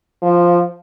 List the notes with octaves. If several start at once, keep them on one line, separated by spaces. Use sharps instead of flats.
F3